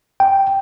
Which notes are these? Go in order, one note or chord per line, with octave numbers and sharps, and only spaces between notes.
G5